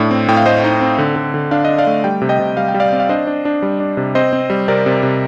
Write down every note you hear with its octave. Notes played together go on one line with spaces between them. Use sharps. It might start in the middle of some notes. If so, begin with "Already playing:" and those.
Already playing: A2 D4
C4
A2 G5
F5
A3 C5 D#5
D#4
C4
D3
D3
D3
D4 F5
D4 D#5
D5 F5
A3
G3 G5
C3
D#5 G5
C3
G3 F5
G5
G3
D5 F5
C4
F5
D4 C5 D#5
D4
D4
G3
D4
C3
C4 C5 D#5
C4
G3
C3 A#4 D5
C3
C3